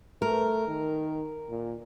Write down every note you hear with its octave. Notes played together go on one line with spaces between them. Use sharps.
A3 A#4
D#3
A#2